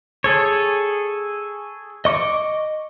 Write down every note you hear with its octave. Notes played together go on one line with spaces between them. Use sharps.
G#4 A4 C#5
D#5 C#6 D6